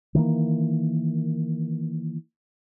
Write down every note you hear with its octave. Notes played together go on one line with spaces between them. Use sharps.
D#3 E3 G3 A#3